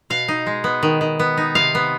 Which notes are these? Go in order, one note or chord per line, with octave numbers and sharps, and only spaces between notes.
B2 F5
D#4
G#3
B3
D#3
D#3
B3
D#4
C3 F5
B3